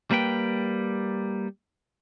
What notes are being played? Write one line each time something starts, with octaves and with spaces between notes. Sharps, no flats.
G3 A#3 B4 G5